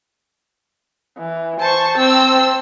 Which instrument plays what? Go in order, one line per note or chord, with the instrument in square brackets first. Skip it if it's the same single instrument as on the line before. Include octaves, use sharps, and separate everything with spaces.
[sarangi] E3
[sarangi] C5 [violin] A5 C#6
[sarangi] C4 [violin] C5 E6